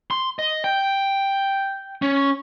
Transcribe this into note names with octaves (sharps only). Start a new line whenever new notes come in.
C6
D#5
G5
C#4